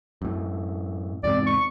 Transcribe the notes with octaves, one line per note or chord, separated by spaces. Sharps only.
F#2 A2
E2 G#2 C3 D5
C#6